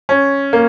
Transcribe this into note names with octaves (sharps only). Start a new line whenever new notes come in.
C#4
A#3